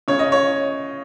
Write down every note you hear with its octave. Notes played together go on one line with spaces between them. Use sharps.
C#3 C#5
D#5
C#5